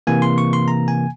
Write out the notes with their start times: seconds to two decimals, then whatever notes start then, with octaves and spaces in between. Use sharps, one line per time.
0.07 C3 E3 A#3 G#5
0.22 C6
0.38 C#6
0.53 C6
0.68 A#5
0.88 G#5